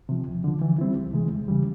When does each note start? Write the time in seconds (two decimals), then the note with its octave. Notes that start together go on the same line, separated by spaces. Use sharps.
0.09 C3 F3
0.27 D2
0.44 D3 F3
0.61 E3
0.78 G3 C4 E4
0.96 C#2
1.13 C3 E3 G#3
1.31 E2
1.48 C#3 E3 G3